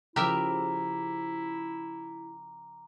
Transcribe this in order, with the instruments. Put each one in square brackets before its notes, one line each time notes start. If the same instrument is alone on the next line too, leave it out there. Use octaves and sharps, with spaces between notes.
[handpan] C#3 F3 [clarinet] E4 [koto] G4 A#4 E5 [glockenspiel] A#5 D6